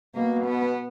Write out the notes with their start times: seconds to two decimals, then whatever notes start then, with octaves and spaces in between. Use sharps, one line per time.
0.15 B2 A#3
0.46 B3